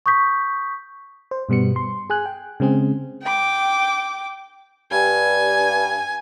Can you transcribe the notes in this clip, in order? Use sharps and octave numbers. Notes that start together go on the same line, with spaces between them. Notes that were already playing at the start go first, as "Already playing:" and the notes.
C#6 D#6 G6 B6
C5
G2 B2 G3 B3 C#7
C6
G#4 G#5 F#6
G5
C#3 G#3 C4 G#4
G5 D6
G2 G#5